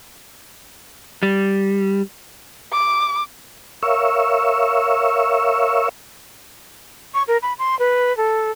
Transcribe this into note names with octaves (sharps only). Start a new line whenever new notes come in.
G3
D6
A#4 C#5 E5 F5 C#6 E6
C#6
A#4
B5
C6
B4
A4